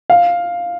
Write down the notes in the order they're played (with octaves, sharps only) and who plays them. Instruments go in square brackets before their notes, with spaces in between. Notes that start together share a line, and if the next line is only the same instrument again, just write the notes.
[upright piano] F5